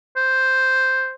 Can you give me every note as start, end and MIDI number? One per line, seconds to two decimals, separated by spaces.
0.17 1.14 72